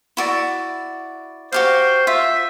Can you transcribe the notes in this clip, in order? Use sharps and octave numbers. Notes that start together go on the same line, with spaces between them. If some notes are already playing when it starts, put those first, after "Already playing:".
E4 F#4 D5
F#4 G4 C5 F5
F4 E5